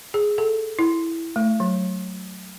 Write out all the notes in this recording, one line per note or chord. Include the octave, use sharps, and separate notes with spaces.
G#4
A4
E4
A3
F#3